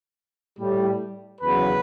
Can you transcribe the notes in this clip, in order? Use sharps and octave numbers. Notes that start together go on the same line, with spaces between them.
A2 G3
E2 C#3 F#3 B4